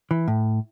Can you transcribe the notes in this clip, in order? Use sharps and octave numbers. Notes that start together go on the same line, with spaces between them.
E3
A2